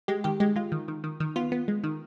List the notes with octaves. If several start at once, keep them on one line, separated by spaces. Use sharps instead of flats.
G#3 G4
D#3 G4
G#3 G4
G#3 F4
D#3
D#3
D#3
D#3
B3 F4
B3
G#3
D#3